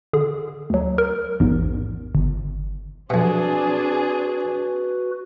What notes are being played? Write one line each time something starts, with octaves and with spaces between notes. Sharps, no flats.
D3 G#4
D2 F#3
A#4
A1 E2 G#2
G1
F2 B2 C4 D4 F#4 G#4 B4